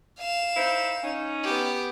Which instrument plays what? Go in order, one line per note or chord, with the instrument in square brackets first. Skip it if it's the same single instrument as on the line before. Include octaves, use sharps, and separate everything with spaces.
[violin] F5 E7
[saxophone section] D#4 E4 C5
C#4 D#4
[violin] B3 G4